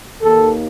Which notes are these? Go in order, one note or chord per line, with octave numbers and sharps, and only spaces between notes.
D#2 D#3 A#3 A4